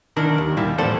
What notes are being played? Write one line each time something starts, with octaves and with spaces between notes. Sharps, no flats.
D#3 D4 E4 A#4
D#2
A#2 D#3 G3 E4
E2 A2 A4 C5 D5